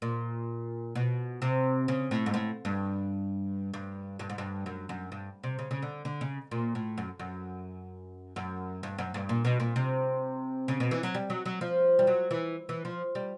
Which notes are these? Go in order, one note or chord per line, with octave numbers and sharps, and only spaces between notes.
A#2
B2
C3
C#3
A2
G#2
A2
G2
G2
G2
G#2
G2
F#2
F#2
G2
C3
C#3
C#3
D3
D3
C#3
A#2
A2
F#2
F#2
F#2
G2
F#2
G2
A#2
B2
A#2
C3
C#3
B2
E3
F#3
G3
F#3
F#3
F3
G3
F#3
E3
E3
F3
G3